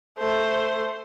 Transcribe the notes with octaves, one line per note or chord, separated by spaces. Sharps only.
A3 C5